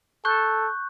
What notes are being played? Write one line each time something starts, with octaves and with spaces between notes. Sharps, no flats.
A4 C#6 F#6 G6